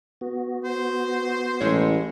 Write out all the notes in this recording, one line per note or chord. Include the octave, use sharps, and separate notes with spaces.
B3 F#4
C5
A1 G#3 E4 C#5